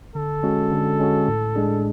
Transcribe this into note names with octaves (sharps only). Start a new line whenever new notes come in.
D3 A4
G#3 C#4 F#4
D3
G#3 C#4 F#4
A2
G#3 D4 G#4